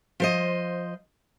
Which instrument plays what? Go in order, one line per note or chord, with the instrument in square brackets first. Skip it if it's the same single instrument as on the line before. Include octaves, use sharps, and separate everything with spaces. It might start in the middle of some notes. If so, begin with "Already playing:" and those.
[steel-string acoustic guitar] F3 C5 D#5